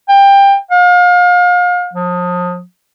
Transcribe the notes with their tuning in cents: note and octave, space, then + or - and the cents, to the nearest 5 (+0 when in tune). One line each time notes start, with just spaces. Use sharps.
G5 +20
F5 +35
F3 +35